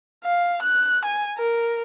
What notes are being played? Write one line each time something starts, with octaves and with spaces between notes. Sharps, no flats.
F5
F#6
G#5
A#4